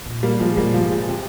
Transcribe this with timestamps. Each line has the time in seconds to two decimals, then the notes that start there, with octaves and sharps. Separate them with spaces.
0.06 A#2
0.23 G3 A#3
0.40 A#2 F3 G#3
0.57 A#2 G3 A#3
0.74 G#2 F3 G#3
0.91 A#2
1.08 C3